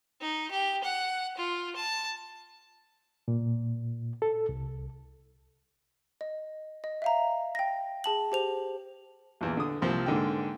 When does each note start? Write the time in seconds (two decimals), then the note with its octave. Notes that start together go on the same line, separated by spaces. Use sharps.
0.21 D#4
0.51 G4
0.83 F#5
1.37 F4
1.76 A5
3.28 A#2
4.22 A4
4.49 C2
6.21 D#5
6.84 D#5
7.02 E5 F5 A#5
7.55 G5 A#6
8.04 G#4 A5 F#7
8.32 G4 C5 F7
9.41 A#1 E2
9.57 D3 D#6
9.82 C2 F3 A#3 C4
10.06 G#2 D3 A#3 G5